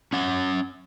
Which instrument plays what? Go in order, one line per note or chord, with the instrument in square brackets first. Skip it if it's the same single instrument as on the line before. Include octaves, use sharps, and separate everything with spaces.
[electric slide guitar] C#4 F#5